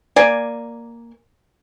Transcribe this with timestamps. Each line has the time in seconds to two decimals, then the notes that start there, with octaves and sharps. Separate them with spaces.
0.16 A#3 D5 G#5